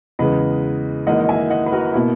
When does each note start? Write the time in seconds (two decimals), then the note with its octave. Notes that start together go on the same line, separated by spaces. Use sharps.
0.19 E2 C#3 G#3 B4 D#5
1.07 G#1 G#2 E3 A#3 D#5 F#5
1.29 E5 G#5
1.50 D#5 F#5
1.66 B4
1.72 F#4 A#4
1.94 B2 A#3 E4